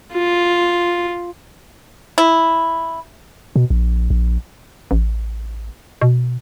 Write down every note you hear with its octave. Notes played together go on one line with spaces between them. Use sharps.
F4
E4
B2
A#1
A#1
A1
B2